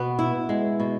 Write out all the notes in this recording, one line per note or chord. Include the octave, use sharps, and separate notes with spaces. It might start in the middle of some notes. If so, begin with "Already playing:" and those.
Already playing: B2 B3
E4
G#3
B2